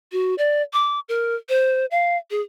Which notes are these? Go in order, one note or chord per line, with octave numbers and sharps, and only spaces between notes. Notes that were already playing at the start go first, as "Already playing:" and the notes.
F#4
D5
D6
A#4
C5
F5
G#4